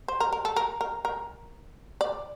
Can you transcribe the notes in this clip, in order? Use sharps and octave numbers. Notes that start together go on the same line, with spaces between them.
C5
A#4
A#4
A4
A#4
A#4
A#4
D5